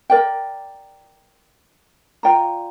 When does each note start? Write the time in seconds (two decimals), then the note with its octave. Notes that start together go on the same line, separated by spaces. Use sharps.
0.10 A#4 D5 G5
2.23 F4 D5 G5 A#5